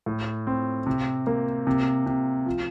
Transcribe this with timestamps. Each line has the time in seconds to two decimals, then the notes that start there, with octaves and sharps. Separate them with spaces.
0.06 A2
0.47 C4
0.86 C3
1.27 A#3
1.67 C3
2.06 C3
2.46 F3